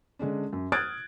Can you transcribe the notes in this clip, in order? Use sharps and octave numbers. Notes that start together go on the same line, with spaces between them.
D3 G#3 C#4 D4
F#2
D#6 F6 F#6 G#6 A6 D7